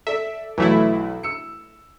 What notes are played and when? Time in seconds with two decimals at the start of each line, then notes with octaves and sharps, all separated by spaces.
0.07 A4 D5 E5
0.58 B1 E3 F#3 A3 E4
1.23 E6 C#7